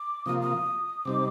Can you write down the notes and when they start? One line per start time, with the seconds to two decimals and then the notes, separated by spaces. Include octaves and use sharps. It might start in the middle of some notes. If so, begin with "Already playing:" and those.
Already playing: D6
0.25 C3 F3 A#3 F4 D#6
0.42 D#6
1.05 C3 G3 C4 D#4 D6